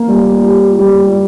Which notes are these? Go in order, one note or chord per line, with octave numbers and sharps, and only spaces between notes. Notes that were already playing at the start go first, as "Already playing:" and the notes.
Already playing: A#3
G3
G4
G3